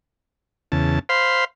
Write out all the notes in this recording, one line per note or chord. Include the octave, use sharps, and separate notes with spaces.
E2 C#3 A5
C5 F5 B5 C6